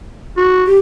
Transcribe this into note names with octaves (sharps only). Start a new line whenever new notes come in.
F#4
G4